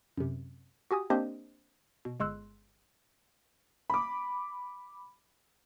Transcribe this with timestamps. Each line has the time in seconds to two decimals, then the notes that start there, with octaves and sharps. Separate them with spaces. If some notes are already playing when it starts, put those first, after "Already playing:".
0.17 F#2 C3
0.91 F#4 G4 G#5 D#6
1.10 A#3 C4 D4 G4 C5 D#5
2.05 B2
2.20 G1 G#3 C6 E6 F#6
3.90 B5 D6